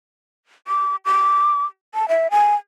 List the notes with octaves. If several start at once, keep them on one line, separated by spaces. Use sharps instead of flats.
D6
D6
A5
E5
G#5